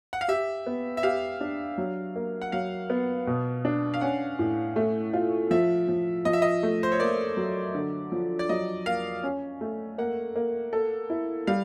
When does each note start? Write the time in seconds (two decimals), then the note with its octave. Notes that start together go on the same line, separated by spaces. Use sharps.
0.13 F#5
0.21 F5
0.28 G4 E5
0.66 B3
0.97 E5
1.03 G4 F5
1.41 D4
1.78 F#3
2.16 A#3
2.42 F#5
2.52 F#3 F5
2.90 B3
3.27 B2
3.65 D4
3.94 F5
4.01 C#4 F#5
4.39 A2
4.76 A3
5.14 F4
5.51 F3 E5
5.88 F3
6.25 F3 D#5
6.33 E5
6.42 D#5
6.63 A3
6.83 C5
6.92 C#5
7.00 A#3 D5
7.37 F#3
7.75 D3
8.12 F3
8.39 D5
8.49 F#3 D#5
8.86 A#3 F5
9.24 C#4
9.61 A3
9.98 A#3 F#5
10.36 A#3
10.73 A4
11.10 E4
11.47 G3 F5